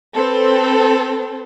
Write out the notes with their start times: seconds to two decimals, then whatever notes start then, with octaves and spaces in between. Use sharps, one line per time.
0.15 C4 A4 B4 C5